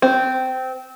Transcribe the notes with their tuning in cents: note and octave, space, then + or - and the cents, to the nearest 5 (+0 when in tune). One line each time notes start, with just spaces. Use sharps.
C4 -15